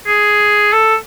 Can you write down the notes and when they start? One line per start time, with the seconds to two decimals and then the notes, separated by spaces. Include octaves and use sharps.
0.07 G#4
0.72 A4